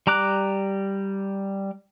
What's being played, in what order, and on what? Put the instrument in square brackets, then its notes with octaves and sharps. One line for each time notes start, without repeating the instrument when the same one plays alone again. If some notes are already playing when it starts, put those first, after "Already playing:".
[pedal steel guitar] G3 A#5 D6 F#6